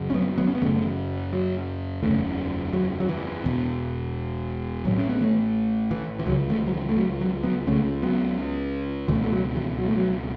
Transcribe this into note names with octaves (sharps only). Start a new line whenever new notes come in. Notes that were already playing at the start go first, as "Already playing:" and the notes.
Already playing: F#1 F#2 C#3
C#4
F#3 B3
F#3 B3
C#4
B3
F#1 F#2 C#3 E3 A3
F#3
F#1 E2 C#3 E3 A3
F#3
F#3
E3
E1 E2 B2
A1 A2 F#3
C#4
B3
E3 A3
E3
E3
C#2 C#3 F#3
E3 A3
F#3
E3
A3
F#3
F#3
F#3 B3
C#2 C#3 A3 C#4
F#3 B3
C#2 B2 E3 A3
A3
F#3
E3
F#3
A3
F#3